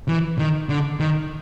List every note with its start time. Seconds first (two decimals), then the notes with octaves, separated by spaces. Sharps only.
0.08 E3
0.39 D#3
0.69 D3
1.00 D#3